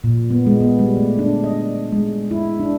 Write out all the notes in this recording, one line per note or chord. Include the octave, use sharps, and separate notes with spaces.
A#2
B3
G#3
B3
G3
A3
D4
D#5
G#3
E4
D4